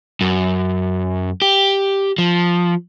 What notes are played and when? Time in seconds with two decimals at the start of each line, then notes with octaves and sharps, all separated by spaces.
0.21 F#2
1.42 G4
2.18 F3